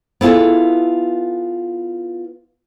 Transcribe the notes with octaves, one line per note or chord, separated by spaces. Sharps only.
B3 E4 F4 G#4 A4